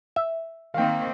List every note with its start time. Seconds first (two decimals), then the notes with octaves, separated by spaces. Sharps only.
0.16 E5
0.74 D#3 A#3 C4 F5 G5